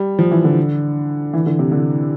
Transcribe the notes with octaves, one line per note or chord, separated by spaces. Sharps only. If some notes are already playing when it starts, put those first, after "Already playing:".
Already playing: G3
F3
E3
D3
E3
D3
C3
D3